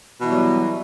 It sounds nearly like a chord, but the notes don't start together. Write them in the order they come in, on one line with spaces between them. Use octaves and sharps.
B2 E3 G3 F#3